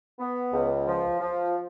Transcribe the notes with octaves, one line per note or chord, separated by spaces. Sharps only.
B3
C#2
F3
F3